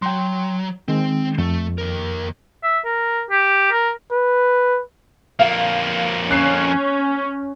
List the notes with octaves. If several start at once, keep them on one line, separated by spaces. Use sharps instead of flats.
F#3 G5 C6
D#3 G#3 C4
F2 A3
D#2 A#4
E5
A#4
G4
A#4
B4
F2 A#3 F5
C#4 F#6 C7 E7